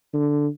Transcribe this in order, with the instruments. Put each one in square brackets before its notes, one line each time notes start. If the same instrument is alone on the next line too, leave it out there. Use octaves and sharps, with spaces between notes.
[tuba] D3